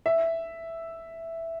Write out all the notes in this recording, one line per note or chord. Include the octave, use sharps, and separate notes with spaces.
E5